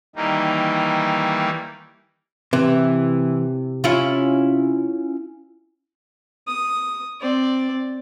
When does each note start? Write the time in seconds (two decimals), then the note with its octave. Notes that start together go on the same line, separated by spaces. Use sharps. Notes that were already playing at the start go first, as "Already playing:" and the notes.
0.16 D#3 E3 G3 A#3 D#4
2.53 C3 E3
3.84 C#4 E4 F4
6.47 D#6
7.21 C4 D5